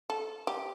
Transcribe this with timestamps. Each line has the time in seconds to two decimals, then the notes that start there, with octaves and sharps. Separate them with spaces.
0.10 A4
0.47 G4